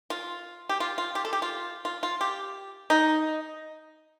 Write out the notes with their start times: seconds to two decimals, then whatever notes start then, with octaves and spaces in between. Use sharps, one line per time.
0.10 F4
0.69 G4
0.80 F4
0.98 F4
1.15 G4
1.25 A4
1.33 G4
1.42 F4
1.85 F4
2.03 F4
2.21 G4
2.90 D#4